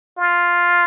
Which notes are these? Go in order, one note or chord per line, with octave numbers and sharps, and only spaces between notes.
F4